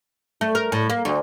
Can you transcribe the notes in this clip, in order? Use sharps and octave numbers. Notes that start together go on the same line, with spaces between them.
A3
A#4
A2
A#3
D2